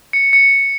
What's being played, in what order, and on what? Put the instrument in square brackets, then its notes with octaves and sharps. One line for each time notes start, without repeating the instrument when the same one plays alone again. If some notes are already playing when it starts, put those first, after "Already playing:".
[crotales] C#7
C#7